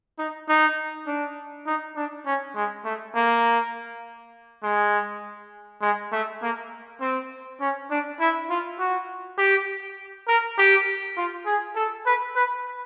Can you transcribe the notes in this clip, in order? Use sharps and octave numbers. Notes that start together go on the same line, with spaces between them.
D#4
D#4
D4
D#4
D4
C#4
G#3
A3
A#3
G#3
G#3
A3
A#3
C4
C#4
D4
E4
F4
F#4
G4
A#4
G4
F4
G#4
A4
B4
B4